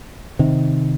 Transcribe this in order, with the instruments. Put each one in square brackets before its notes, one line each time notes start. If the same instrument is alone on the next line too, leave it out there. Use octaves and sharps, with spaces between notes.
[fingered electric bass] C3 D#3